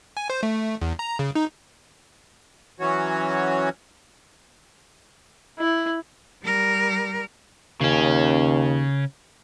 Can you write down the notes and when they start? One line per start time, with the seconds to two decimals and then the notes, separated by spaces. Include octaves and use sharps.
0.17 G#5
0.30 C5
0.43 A3
0.82 E2
0.99 A#5
1.19 C#3
1.35 D#4
2.80 E3 F#3 C#4 F#4 C#5
5.59 E4
6.44 G3 A#4
7.81 D#2 C#3 C#4